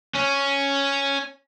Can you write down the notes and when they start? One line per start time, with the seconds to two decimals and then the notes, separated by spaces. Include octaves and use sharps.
0.16 C#4